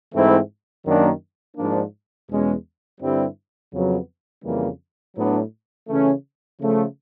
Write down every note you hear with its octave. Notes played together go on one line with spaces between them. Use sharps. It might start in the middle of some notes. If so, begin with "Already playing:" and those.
G#2 E3 A3 C4 E4
F#2 D#3 F#3 A#3 D4
G#2 F3 A#3 D4
E2 B2 G#3 C#4
G2 D3 G3 C4 E4
F2 C#3 F#3 B3
F2 C#3 E3 G3 A#3
A2 F#3 B3 D4
C#3 E3 A3 C#4
C#3 F3 A3